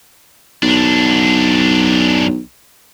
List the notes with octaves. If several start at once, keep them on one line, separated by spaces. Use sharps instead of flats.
B1 F#2 D4